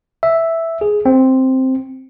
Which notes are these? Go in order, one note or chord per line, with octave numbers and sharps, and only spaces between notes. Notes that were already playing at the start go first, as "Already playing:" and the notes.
E5
G#4
C4